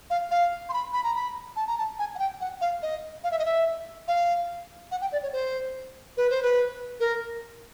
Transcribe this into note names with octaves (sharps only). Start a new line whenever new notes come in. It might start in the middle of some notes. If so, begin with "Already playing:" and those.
F5
F5
C6
B5
B5
A#5
B5
A5
A#5
A5
G#5
F#5
G5
F#5
F5
D#5
F5
E5
D#5
E5
F5
F#5
G5
D5
C#5
C5
B4
C5
B4
A#4